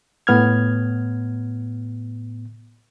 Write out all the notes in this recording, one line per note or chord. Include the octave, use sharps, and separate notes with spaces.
A2 B3 F6 G#6